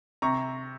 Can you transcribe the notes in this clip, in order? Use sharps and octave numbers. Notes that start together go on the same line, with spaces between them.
C3 A#5 C#6